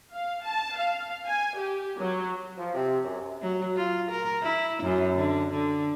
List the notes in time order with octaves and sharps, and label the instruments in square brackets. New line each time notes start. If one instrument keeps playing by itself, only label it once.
[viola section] F5
A5
F5
G#5
G4
F#3
[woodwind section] F3
C3
F#2
[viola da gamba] F#3
F4
A#4
E4
F#2
D3
D3